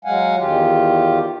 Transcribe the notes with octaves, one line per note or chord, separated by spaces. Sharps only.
F#3 G#3 F5 F#5 G#5
E2 D#3 F4 G4